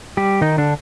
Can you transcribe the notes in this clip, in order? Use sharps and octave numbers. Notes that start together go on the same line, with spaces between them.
G3 G4
D#3 D#4
D3 D4